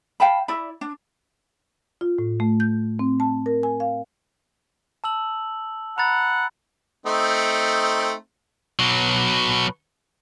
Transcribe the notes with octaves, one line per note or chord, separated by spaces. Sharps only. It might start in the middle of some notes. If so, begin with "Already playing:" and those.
F5 G5 A5 B5
E4 D5 B5
D4
F4
A2
A3
G6
C4
A5
A#4
G#5
F5
A5 E6 F#7
F#5 A#5 B5 A6
A3 C4 D#4
B2 F#3